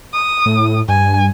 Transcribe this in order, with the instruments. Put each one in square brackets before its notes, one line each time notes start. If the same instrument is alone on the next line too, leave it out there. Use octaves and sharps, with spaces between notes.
[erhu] D#6
[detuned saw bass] A2
[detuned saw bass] G2 [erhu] G#5